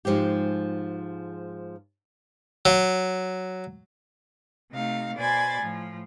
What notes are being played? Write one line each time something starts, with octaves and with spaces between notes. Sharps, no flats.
G#2 F3 G#3 G4
F#3
C3 A3 D#4 F5
B2 C5 D5 G#5 B5 A6
A2 F3